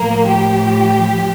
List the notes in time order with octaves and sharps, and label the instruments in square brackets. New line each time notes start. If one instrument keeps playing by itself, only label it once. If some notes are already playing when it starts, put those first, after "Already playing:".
Already playing: [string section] A2 F3 A#3
G4